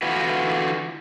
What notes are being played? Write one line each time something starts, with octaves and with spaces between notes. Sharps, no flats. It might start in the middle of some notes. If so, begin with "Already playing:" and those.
D3 E3 F4 F#4 B4